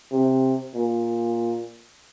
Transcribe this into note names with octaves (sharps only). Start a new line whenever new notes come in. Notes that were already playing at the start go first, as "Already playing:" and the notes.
C3
A#2